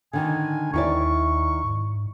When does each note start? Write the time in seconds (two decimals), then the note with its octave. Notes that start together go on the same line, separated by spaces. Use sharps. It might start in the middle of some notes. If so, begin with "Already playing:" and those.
0.13 D3 D#3 G#5
0.73 D#2 D#3 E4 D5 C#6
1.64 G#2